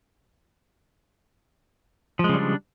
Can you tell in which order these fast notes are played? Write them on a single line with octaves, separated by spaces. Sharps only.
F3 G#3 C#3 G3 D4